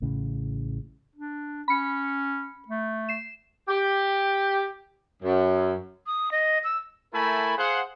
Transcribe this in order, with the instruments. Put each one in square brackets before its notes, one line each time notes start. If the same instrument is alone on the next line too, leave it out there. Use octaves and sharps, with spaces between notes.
[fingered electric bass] A1 A2 C#3
[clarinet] D4
[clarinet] C#4 [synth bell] B5 C#7
[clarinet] A3
[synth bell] C7 E7
[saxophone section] G4
F#2
[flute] D#6
D#5
E6
[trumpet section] A3 E4 A#4 G#5 A5 B5
G#4 C5 F5 F#5